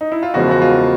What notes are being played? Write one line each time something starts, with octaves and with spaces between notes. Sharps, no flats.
D#4
E4
F4
E1 E2 C#3 F3 G#3 F#4
F#4
F4